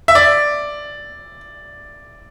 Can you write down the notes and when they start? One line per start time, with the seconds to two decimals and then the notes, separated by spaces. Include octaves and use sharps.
0.08 E5
0.15 D5